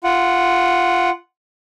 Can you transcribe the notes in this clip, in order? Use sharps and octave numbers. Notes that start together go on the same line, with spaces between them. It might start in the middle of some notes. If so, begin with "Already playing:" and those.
F4 F#5